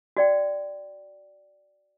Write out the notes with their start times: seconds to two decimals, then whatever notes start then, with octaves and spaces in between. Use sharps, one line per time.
0.17 F#4 D5 G5